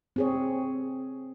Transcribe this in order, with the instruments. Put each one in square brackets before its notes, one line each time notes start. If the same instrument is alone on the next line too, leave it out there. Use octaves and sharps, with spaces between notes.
[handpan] C4 G#4 C#5